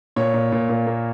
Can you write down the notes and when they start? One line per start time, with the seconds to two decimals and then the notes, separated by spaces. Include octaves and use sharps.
0.16 A#2 C#5
0.34 A#2
0.52 A#2
0.69 A#2
0.86 A#3